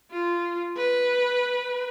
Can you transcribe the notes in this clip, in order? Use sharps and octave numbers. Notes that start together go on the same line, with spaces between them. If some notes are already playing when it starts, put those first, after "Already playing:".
F4
B4